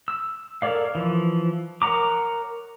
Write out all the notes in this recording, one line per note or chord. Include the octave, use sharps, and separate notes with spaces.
E6
A4 A#4 C#5 D5 F5
E3 F3
A#4 C#5 F#5 A#5 D6